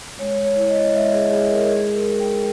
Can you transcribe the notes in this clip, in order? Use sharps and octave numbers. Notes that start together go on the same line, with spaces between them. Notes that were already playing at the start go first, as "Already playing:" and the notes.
G#3 C#5
C#5
E4
D#5
G#3 E5
G#4
G#3 G#4
A#4
D#4 G#4
A#4
D#4
G5